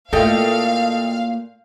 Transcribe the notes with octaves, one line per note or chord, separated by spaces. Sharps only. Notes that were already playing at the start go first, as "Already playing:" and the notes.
A#2 A3 E4 A4 D#5 F5 G5